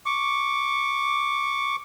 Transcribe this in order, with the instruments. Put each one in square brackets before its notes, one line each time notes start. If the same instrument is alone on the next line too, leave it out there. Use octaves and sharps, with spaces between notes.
[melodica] C#6 D6